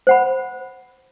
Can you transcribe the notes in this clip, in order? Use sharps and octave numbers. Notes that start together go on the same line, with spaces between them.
C5 F#5 B5